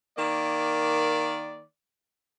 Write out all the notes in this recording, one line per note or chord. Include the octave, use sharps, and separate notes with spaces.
D#3 A#3 D5